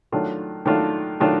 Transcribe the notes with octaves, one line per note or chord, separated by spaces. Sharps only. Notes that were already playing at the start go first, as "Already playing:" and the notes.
D#3 F#3 A3 D4 F4
D#3 F#3 A3 D4 F4
D#3 F#3 A3 D4 F4